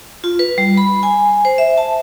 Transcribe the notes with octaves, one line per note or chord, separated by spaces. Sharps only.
F4
B4
G3
B5
G#5
C5
E5
A5